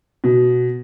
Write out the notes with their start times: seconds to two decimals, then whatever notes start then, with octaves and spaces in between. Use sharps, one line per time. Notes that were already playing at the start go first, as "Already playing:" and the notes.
0.24 B2